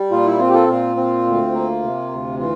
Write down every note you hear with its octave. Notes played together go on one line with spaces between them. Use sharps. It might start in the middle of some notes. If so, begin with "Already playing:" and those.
Already playing: G3
A#2 F4
E4
C4 F4
G4
F4 A4
A#2 F4
C4
D2
A#3
C3
D2
E3 F4